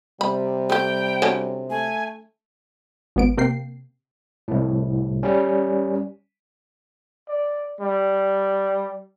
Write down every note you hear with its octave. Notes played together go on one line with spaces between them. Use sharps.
C3 G3 B5
A3 G4 G5
D3 F#3 C#4
A3 G#5
G#1 B3 D7
C3 A#3 G5 C7
C2 A2
G3 C#4
D5
G3